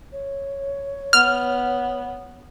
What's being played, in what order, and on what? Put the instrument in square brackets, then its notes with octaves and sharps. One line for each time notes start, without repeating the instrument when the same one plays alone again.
[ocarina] C#5
[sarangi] B3 [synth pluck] F6